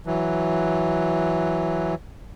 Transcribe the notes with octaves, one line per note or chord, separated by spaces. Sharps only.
E3 F#3